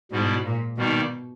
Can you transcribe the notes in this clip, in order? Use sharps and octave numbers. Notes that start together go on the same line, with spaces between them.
G#2 B2 G3 B3 E4
A#2
B2 D#3 G3 A#3 D#4